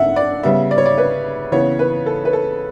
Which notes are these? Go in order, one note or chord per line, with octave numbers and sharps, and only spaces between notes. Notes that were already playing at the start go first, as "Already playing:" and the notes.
Already playing: D3 E5 F#5
D5
C#3 G3 B3 E5
D5
C#5
D5
B4
C#3 E3 B3 C#5
B4
A4
B4
A4